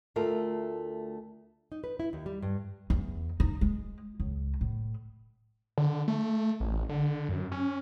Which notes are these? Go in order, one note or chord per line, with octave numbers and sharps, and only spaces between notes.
D2 A3 F4 A#4
D#4
B4
E4
D#2
G3
G2
E2
D#4
G#3
C#2
A2
D3
A3
A1
D3
F#2
C#4